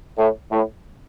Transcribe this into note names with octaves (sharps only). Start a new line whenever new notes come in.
A2
A2